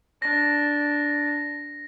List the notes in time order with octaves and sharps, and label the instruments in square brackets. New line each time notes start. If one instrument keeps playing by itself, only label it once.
[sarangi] D4 [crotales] A#6